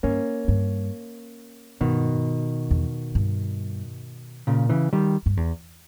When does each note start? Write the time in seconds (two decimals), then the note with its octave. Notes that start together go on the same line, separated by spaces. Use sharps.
0.03 G2 A#3 C#4
0.48 G2
1.81 G2 B2 D#3
2.71 E2
3.15 G2
4.47 A#2 C#3
4.69 C#3 E3
4.93 D#3 G3
5.26 G2
5.37 E2